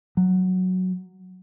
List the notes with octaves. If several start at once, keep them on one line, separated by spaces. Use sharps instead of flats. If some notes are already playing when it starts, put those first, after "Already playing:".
F#3